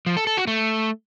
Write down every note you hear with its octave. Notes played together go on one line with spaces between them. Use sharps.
F3
A4
A4
F#4
A3